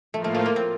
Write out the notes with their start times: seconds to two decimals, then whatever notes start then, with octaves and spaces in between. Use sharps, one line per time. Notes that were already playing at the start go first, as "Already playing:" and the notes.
0.14 A2 F3 A3 A#3 F4
0.24 A3
0.35 A3
0.46 A#3
0.56 C4